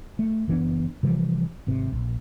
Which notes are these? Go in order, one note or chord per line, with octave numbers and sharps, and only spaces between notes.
A3
F#1 E3 B3 D4
C3 E3 F3 G3
G#1 C3
A#1